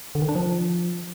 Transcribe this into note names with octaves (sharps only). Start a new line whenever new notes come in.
D3
D#3
D4
F3